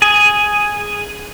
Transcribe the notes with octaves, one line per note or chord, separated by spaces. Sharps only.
G#4